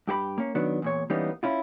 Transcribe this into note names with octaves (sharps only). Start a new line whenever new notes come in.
G2 G4 G#4 B5
A#3 C#4
D#3 F#3 B3 D4
E2 A#2 C#5
E3 G3 A#3 B3 C#4 D#4
C#4 E4 F4